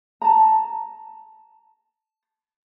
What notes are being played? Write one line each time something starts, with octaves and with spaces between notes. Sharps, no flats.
A5 A#5